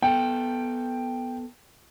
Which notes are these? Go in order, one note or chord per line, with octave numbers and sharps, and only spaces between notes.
B3 A4 G5